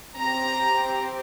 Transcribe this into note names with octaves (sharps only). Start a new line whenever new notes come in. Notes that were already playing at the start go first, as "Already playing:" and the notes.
C4 G4 A#5